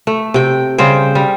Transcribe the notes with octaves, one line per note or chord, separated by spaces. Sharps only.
A3
C3 G5
C#3 G3 C5 G5
G3